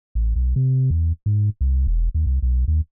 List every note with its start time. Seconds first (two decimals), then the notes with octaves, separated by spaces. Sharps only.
0.15 A1
0.36 B1
0.56 C3
0.91 E2
1.26 G#2
1.61 C2
1.87 E1
2.14 D#2
2.27 C2
2.42 B1
2.68 D#2